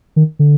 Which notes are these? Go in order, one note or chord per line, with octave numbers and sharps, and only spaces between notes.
D#3
D3